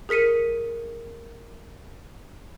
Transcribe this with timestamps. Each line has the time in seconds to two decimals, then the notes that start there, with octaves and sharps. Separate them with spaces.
0.09 G#4 A#4 B6 C#7 D#7